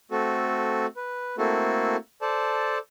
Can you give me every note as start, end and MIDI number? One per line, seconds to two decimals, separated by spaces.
0.11 0.86 57
0.11 0.86 60
0.11 0.86 66
0.11 0.86 69
0.97 1.36 71
1.38 1.96 57
1.38 1.96 58
1.38 1.96 60
1.38 1.96 64
1.38 1.96 66
1.38 1.96 69
2.22 2.78 69
2.22 2.78 72
2.22 2.78 74
2.22 2.78 81